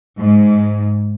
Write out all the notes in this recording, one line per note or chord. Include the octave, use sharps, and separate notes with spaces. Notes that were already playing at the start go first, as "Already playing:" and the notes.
G#2